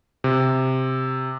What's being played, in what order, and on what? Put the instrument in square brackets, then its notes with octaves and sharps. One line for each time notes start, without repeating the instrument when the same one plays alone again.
[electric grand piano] C3